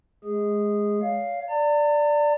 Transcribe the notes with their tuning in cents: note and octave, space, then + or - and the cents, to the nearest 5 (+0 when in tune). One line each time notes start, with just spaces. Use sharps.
G#3 +15 G#4 -15
C#5 +35 F5 +0
D5 +0 A#5 -45